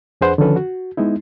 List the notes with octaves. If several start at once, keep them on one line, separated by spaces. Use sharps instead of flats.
F2 D4 G#4 B4 C5 F#5
D3 D#3 F3 C#4 A4 B4
F#4
G#3 B3 D#4 E4